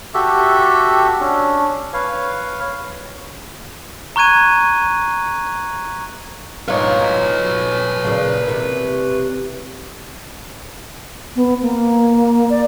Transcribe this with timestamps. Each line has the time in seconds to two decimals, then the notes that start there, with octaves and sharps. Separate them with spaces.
0.14 F#4 G4 A4 E5
1.21 C#4 D4
1.93 B4 C#5 F5
4.16 A#5 C#6 F#6 G#6 D#7
6.68 G#2 D#4 F4 B4 C#5
8.04 A#2 C#3
8.48 C3 E3
11.36 B3
11.62 A#3
12.50 D5